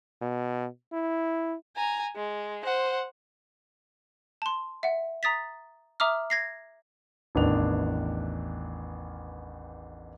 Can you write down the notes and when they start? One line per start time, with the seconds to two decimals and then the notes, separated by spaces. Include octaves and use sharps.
0.22 B2
0.93 E4
1.76 G#5 A#5
2.16 G#3
2.64 C5 F#5
4.42 A5 C6
4.83 E5 F#5
5.23 A#5 D#6 A6 B6
6.00 E5 A#5 D6 D#6 F6
6.30 G#6 A#6 C7
7.35 A1 E2 D#3 D4 F7